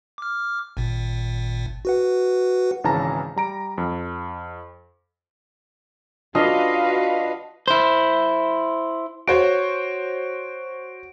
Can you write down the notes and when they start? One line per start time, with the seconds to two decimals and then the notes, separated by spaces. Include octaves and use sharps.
0.18 D6 F6
0.77 G#1 A#2
1.85 F#4 B4 F#5
2.84 G#1 C#3 E3 A5 A#5
3.36 G3 A#5 D7
3.78 F2
6.35 D4 F4 F#4 B4 D#5 F5
7.68 E4 C5
9.28 F#4 C5 C#5 D7